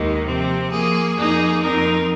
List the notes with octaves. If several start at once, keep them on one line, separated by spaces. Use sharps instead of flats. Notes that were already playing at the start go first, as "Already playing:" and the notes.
Already playing: D#2 D#3 G#3 D#4
C3 F3 C4
F3 A#3 G#4
F2 F3 A#3 D#4 G#4
F2 F3 C4 D#4 A#4